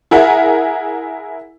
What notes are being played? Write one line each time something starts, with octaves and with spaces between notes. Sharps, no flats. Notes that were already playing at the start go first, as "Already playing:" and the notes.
E4 G#4 A#4 E5 F#5